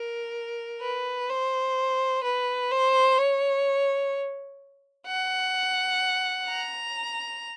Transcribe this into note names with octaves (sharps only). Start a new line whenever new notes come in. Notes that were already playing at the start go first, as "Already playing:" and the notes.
Already playing: A#4
B4
C5
B4
C5
C#5
F#5
A#5